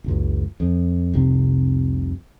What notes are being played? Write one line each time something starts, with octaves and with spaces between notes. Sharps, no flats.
F#1 C#2
F2
F1 C2 C3